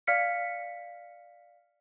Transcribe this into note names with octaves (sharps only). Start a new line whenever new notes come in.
D5 F5 F6 B6 C#7